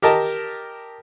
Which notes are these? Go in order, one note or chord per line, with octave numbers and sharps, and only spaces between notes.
G4 A#4 D#5 A5